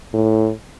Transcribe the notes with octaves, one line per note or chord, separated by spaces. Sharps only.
A2